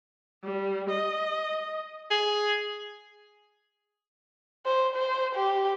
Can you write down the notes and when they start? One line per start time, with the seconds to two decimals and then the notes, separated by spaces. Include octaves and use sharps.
0.44 G3
0.90 D#5
2.11 G#4
4.66 C5
4.95 C5
5.35 G4